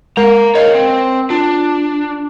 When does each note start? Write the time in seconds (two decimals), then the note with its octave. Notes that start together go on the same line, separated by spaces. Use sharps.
0.17 G#3 A#4 F5 A#5
0.55 A#4 C#5 D#5 F5
0.75 C4
1.30 D4 F4